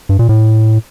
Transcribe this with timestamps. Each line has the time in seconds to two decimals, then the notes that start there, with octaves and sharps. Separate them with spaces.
0.09 G2
0.19 A#2
0.29 A2